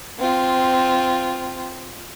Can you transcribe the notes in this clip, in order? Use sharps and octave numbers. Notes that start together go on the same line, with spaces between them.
C4 F4